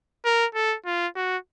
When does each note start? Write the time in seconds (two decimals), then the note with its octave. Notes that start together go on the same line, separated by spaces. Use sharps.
0.25 A#4
0.55 A4
0.86 F4
1.16 F#4